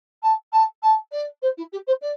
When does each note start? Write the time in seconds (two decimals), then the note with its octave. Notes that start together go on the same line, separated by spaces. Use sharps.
0.23 A5
0.52 A5
0.83 A5
1.12 D5
1.42 C5
1.57 E4
1.72 G4
1.87 C5
2.01 D5